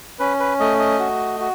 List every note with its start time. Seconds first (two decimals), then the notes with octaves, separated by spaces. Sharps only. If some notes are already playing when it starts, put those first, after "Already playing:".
0.19 C#4 B4
0.40 B4
0.60 A3 D#5
0.79 D#5
0.99 F#4
1.40 F#4